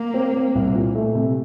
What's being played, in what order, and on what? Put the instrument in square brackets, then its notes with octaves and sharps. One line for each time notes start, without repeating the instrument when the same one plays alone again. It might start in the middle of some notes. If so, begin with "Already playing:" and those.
Already playing: [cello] A#3
[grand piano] C4
C4
C2
A#2
A3
C3